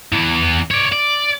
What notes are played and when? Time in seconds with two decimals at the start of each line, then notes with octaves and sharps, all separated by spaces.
0.12 E2 E3
0.71 C#5 D5
0.92 D5